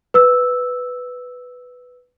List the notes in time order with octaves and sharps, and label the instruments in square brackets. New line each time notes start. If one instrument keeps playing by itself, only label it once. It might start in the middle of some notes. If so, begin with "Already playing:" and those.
[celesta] B4 E6